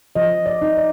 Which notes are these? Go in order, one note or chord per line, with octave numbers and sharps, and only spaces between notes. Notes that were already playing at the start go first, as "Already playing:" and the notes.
F3 D#5
D5
D#4
D5